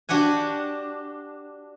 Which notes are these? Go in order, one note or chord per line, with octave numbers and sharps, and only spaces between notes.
D4 F#4 G4 F#5 G#5